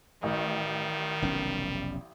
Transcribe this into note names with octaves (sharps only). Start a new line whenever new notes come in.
A1 D#3 G3
F1 B1 C#4